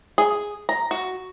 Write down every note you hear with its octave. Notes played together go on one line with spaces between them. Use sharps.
G#4
A#5
F#4